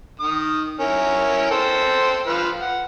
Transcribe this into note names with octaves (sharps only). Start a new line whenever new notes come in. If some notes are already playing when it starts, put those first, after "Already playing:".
D#3 D#6
C#4 E4 A#4
A4 C5 G5
F3 B4 F5
F#5